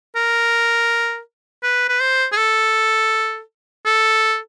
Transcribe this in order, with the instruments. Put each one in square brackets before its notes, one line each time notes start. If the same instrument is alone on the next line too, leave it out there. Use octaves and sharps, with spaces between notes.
[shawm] A#4
B4
B4
C5
G#4
A4
A4